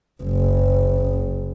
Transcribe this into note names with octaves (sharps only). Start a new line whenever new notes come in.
F#1